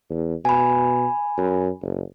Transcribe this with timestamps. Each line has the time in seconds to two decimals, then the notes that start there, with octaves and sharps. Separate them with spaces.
0.10 E2
0.45 B2 G#5 B5
1.38 F#2
1.82 F#1